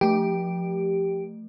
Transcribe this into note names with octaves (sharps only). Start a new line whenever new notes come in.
F3 A3 G4